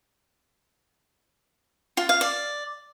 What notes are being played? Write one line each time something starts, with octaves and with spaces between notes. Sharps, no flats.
F4
F5
D5